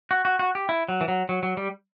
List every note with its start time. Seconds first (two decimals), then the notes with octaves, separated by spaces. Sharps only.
0.11 F#4
0.25 F#4
0.39 F#4
0.55 G4
0.69 E4
0.89 F#3
1.01 E3
1.08 F#3
1.29 F#3
1.43 F#3
1.57 G3